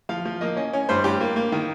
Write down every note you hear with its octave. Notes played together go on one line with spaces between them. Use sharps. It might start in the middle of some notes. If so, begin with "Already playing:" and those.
F3 F5
F3
A#3 D#5
C#4 D#5
C#4
G2 C5
G2 G4
A#3
A#3
D#3